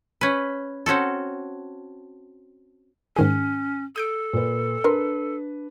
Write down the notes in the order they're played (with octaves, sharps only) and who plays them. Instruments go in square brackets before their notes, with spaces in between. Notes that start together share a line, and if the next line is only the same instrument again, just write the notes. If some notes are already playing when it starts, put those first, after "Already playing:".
[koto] C#4 B4
C4 C#4 F#4 A4
[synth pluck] G#2 D#3 G#4 [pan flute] C#4
[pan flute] A4 [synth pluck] D#6 G6 D7
[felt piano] A#2 B4
[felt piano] D4 B4 [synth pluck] A#4 C6